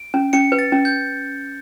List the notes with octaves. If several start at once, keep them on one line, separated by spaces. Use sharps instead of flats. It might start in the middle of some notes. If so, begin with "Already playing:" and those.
Already playing: D7
C#4
C#4 C#7
B4
A6
C#4
G6